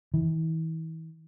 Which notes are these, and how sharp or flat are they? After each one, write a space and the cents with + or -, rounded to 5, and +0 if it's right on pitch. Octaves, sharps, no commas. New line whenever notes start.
E3 -40